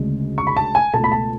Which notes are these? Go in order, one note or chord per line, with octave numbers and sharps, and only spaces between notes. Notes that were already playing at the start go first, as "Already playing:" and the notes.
Already playing: D2 C#3 G#3 D4
C#6
B5
A5
G#5
C#2 B2 A3 A5
B5
A5